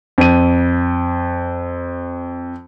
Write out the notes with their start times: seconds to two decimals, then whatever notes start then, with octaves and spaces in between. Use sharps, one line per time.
0.18 F2 D#7